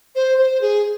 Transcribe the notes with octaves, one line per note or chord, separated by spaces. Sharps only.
C5
C5
G#4